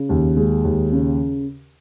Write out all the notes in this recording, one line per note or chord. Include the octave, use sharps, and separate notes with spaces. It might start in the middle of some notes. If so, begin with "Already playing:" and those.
Already playing: C#3
D#2
G#3
D#2
C#3